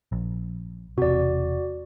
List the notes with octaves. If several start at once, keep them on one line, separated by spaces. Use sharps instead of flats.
A#1
E1 C3 F#4 D5